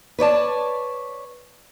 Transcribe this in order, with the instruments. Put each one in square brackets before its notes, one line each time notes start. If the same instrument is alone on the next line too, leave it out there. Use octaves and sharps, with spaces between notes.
[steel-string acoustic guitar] B4 C#5 D5 A5